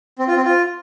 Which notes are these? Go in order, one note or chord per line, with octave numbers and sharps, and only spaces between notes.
C4
F4
C4
F4